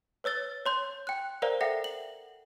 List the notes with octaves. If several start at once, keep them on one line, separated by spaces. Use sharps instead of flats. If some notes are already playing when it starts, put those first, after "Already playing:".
B4 C#5 E6 A6 G7
C#5 C6 G6
G5 F#6
A#4 C5 D5 F5 A#5
A4 E5 F#5 G5 A#6
F#7